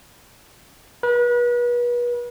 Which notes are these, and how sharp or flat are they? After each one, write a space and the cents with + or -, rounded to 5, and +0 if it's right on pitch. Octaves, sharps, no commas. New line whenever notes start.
B4 -35